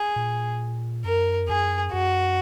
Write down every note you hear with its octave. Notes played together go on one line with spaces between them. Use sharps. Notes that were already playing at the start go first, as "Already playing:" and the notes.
Already playing: G#4
A#2
F#2 A#4
F2
F#2 G#4
F#2 F#4